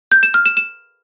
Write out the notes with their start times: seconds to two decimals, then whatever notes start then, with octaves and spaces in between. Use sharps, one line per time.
0.12 G6
0.23 E7
0.34 F6
0.46 E7
0.57 E7